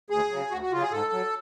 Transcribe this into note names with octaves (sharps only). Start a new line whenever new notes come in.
D2 G#4
C#3 F#3
D2 F#4
F#4
C#3 F#3 F4
G#4
G#2 A4
F#3